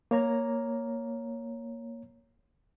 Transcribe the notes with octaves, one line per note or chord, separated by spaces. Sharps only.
A#3 C#5 A#5